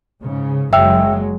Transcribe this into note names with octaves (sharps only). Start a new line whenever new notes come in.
G#2 C#3
F#1 F#3 G#3 E5 G5 E6